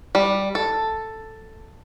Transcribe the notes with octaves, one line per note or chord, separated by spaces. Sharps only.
G3
A4